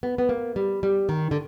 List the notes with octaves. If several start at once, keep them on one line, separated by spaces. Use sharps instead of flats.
B3
B3
A#3
G3
G3
D#3
D3